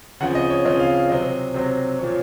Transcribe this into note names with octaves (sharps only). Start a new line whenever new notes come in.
C#3 F3 C4 F#5
D#5
C#5
C#3 F3 C4 D#5
F5
F5
C3 F#3 C4 D#5
C3 F#3 C4
A#2 F3 C4 C#5